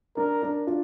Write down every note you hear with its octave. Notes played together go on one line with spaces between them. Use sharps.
D4 A#4
D4
D4 F4